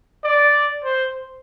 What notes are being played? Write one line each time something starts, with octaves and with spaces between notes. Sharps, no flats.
D5
C5